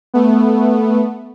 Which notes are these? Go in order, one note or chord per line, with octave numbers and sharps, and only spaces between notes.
A3 B3